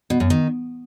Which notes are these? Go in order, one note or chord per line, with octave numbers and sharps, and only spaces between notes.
B2
F#2
D#3